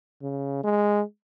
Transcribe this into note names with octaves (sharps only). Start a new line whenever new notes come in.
C#3
G#3